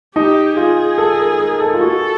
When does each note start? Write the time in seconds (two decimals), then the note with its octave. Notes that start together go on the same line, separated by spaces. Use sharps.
0.15 D#4 G4
0.57 F4 G#4
0.98 A4
1.19 A#4
1.40 A#4
1.60 A4
1.73 F4
1.81 F#4 A4